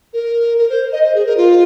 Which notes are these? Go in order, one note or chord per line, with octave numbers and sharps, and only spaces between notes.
A#4
A#4
C5
D#5
C5
G#4
A#4
F4